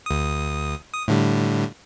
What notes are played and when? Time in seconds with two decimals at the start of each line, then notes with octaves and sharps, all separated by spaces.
0.06 D2 D#6
0.94 D#6
1.08 A2 D3 G3